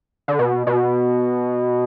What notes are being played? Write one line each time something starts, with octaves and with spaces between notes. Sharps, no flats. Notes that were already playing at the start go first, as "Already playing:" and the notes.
D3
B2
B2